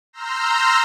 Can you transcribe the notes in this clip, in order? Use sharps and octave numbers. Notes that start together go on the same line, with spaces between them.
A#5 C6 E6 F6 G6 A#6